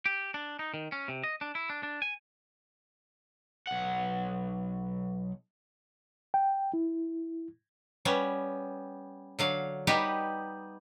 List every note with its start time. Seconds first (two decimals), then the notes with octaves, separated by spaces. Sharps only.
0.06 G4
0.34 D4
0.59 D#4
0.74 D#3
0.92 C#4
1.08 C3
1.24 D#5
1.41 D4
1.55 E4
1.70 D4
1.83 D4
2.02 G#5
3.67 B1 F#5
6.34 G5
6.74 E4
8.05 G3 B3 C#4
9.39 D3 F#3 F5
9.87 G3 B3 D#4 G4 B4